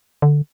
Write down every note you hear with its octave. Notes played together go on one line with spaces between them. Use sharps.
D3